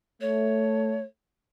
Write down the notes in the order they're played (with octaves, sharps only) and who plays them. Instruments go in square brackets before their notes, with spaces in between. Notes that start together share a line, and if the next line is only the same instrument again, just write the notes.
[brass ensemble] A3 [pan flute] C#5